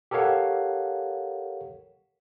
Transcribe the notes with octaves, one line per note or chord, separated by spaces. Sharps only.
G4 A4 A#4 C#5 F5 F#5